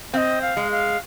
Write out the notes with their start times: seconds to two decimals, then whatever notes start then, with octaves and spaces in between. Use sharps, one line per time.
0.13 C4 D#5 F5
0.42 F5
0.57 G#3
0.72 F5